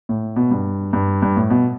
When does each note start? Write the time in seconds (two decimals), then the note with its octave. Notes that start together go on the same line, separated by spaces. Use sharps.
0.09 A2
0.36 B2
0.51 G2
0.93 G2
1.22 G2
1.37 A2
1.50 B2